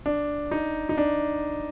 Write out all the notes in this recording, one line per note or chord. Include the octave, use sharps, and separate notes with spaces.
D4
D#4
D#4
D4